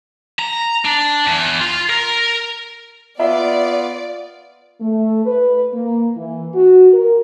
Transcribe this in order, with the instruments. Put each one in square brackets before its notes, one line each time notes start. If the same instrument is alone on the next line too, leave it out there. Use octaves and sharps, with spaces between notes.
[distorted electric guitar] A#5
D4
E2
F4
A#4
[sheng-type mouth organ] B3 [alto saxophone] F4 [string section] D5 [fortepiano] E5
[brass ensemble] A3
B4
A#3
E3
F#4
A#4